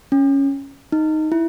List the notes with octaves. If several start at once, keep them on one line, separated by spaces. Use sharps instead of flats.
C#4
D#4
E4